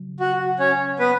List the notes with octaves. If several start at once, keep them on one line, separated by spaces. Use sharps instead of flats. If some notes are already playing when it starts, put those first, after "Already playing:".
Already playing: C#3 F#3
F#4
C#4 C#5
B3 B4